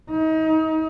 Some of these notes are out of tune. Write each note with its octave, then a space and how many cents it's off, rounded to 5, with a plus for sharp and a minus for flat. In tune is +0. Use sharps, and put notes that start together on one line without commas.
D#4 +30